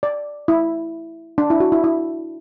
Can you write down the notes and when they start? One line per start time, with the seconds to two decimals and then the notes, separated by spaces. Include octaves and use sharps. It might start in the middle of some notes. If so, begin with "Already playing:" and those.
0.03 D5
0.48 E4
1.38 D4
1.50 E4
1.60 F#4
1.72 E4
1.84 E4